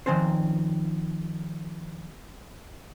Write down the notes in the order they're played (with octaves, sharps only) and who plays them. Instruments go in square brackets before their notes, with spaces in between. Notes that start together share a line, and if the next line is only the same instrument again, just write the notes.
[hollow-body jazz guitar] D#3 F3 C4 C#4 C5